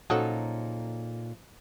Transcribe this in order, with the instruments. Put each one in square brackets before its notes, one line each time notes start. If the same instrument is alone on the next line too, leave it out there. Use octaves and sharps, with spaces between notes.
[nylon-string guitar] A#2 D#4 A4 [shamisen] C#3 F3 F#3